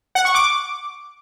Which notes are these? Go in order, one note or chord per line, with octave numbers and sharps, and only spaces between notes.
F#5
C#6
D6